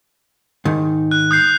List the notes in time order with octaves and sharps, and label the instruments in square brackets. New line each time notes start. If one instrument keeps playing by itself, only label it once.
[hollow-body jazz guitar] G#2 D#3
[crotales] F#6
D#6 G6 C7